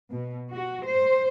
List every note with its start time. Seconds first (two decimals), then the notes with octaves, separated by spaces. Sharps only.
0.11 B2
0.52 F#4
0.87 C5